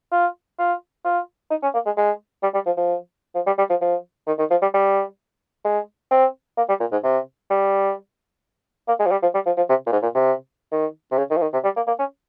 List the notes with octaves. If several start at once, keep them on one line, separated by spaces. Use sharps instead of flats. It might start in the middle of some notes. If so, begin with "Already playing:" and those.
F4
F4
F4
D#4
C#4
A#3
G#3
G#3
G3
G3
F3
F3
F3
G3
G3
F3
F3
D#3
D#3
F3
G3
G3
G#3
C4
A#3
G3
A#2
G#2
C3
G3
A#3
G#3
F3
G3
F3
G3
F3
F3
C3
A#2
G#2
A#2
C3
D#3
C3
C#3
D#3
F3
D#3
C3
G3
A#3
A#3
C#4